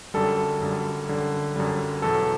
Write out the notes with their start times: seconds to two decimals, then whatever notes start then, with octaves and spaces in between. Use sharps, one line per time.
0.14 F#2 D3 G3 A4
0.61 F#2 D3 G3
1.08 F#2 D3 G3
1.56 F#2 D3 G3
2.02 E2 B2 F#3 A4